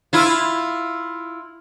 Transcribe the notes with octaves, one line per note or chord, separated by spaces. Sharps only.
E4 F4